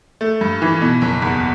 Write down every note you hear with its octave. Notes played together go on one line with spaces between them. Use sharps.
A3
G2
E3
B2
F#1
E2